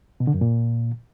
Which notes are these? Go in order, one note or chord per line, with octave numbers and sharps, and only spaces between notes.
B2
D3
F#2
A#2